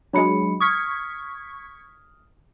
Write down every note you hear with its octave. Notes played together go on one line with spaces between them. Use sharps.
F#3 G#3 D4 B5 C#7
C#6 D#6 F6 G#6 B6